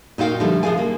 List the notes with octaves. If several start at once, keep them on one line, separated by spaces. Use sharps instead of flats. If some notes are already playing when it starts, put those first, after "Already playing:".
A#2 D#4 F#4 F5 G5
D3 F3 G3 A3
C3 F3 G#3 G#4 F5 G#5
A#3